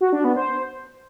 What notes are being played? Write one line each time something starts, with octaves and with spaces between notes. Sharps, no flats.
F#4
D4
B3
C5